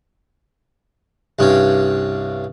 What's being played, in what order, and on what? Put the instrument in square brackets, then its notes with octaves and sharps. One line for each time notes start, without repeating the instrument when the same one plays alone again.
[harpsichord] C2 G2 C#4